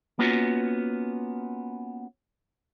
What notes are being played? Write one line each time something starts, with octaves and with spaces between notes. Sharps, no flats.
A#3 B3 C#4 F4 F#4